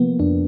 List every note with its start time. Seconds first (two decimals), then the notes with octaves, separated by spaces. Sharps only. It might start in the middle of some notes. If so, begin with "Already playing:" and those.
Already playing: C3 F3 A#3 B3
0.19 F2 D4